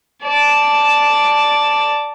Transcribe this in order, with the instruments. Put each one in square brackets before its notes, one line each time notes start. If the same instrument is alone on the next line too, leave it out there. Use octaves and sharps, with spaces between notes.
[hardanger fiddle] D5 A5